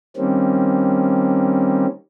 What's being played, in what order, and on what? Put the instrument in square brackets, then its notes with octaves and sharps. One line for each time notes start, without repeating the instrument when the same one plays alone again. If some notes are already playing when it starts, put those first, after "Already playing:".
[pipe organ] D#3 G3 A#3 C4 C#4